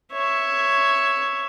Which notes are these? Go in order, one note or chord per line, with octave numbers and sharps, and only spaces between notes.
C#5 E5